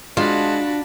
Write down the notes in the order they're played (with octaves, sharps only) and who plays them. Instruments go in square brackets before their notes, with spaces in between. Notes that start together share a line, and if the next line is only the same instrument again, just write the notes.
[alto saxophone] G#3 [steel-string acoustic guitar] D4 [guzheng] F4 [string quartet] F#4 A5 B5